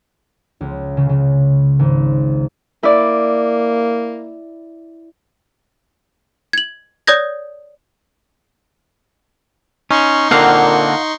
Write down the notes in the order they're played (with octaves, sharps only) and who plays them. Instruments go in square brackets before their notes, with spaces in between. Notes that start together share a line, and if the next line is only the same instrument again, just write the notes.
[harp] C#2
C#3
C#3
G#1
[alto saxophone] A#3 [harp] E4 D5
[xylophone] G#6 F#7
C#5 D5 D#6 G6 G#6 A#6
[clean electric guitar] C#4 [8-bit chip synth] D#4 C6 C#6
[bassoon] A#2 [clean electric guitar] D3 A#3 C4 [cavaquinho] F5 F#5